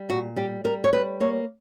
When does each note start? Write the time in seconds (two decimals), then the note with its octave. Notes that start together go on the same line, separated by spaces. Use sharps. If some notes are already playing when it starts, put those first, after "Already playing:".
Already playing: G3
0.09 A#2 F#4
0.36 G3 G4
0.64 G3 A#4
0.84 C#5
0.93 G3 B4
1.20 A#3 C#5